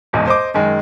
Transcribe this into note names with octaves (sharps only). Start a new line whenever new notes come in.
D#1 E2 G#2 B2
C5 D#5 D6
F#2 D#3 G#3